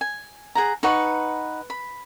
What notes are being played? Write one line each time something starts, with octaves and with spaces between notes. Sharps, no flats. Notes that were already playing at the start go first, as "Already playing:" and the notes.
G#5
G#4 F#5 A#5
D#4 B4 F#5 C#6
B5